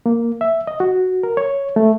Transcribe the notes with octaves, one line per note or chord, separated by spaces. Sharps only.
A#3
E5
D#5
F#4
A#4
C#5
A3